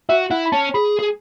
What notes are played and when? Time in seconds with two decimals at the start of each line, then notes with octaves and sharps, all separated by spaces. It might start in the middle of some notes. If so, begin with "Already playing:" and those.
0.09 F#4 E5
0.31 E4 F#5
0.46 B5
0.52 C#4 A5
0.74 G#4 B5
0.99 G#4